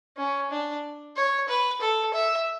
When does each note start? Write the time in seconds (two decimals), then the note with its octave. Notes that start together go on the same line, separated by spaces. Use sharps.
0.17 C#4
0.51 D4
1.16 C#5
1.49 B4
1.81 A4
2.14 E5